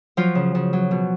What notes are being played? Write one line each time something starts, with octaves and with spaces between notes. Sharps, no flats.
F3 F#3 F4
C#3
C#3
F#3
B2